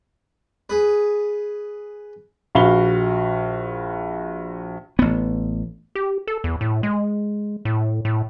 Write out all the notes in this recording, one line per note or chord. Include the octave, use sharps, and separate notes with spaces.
G#4 B4
A#1 F#4 F5 B5 G7
A1 B3
G4
A4
E2
A2
G#3
A2
A2